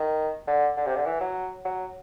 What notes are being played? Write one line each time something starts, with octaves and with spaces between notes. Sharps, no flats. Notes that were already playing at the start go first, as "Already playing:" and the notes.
Already playing: D#3
D3
D3
C3
D3
E3
F#3
F#3